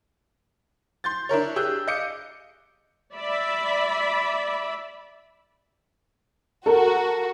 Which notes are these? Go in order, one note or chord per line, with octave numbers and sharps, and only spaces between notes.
C6 G6 A6
D4 E4 A#4 C#5
G4 G#4 E6 F#6 G6
D#5 F5 D6 G6 C#7
D5 E5 B5
F#4 A4 A#4